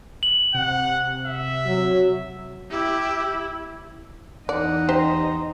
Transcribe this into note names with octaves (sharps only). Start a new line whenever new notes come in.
F#7
C3 F#5
E5
F#3
E4 G4
E2 D#4 D5 F#5
G4 C5 A#5